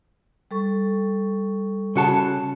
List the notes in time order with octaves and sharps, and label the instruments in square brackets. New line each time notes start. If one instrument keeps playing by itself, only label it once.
[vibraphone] G3 A4 C#6
[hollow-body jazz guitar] C#3 F#4 A5